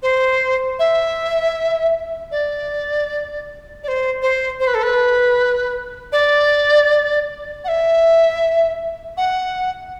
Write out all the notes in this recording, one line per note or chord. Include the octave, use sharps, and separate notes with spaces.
C5
E5
D5
D5
C5
C5
C5
B4
A4
B4
D5
F#5
E5
F#5